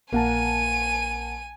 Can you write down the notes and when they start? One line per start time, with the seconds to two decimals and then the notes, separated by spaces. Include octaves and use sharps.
0.13 A#1 A#3 F#5 G#5 A5 D#7